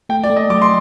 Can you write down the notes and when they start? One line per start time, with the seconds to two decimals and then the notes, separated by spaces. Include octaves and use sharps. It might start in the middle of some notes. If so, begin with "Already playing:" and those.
0.09 A3 G5
0.24 D5
0.30 A3
0.36 D#5
0.50 F#3 D6
0.62 C6